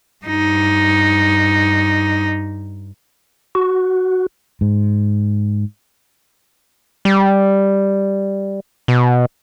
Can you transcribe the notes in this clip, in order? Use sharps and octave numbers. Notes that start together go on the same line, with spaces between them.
G2 D#4
F#4
G#2
G3
B2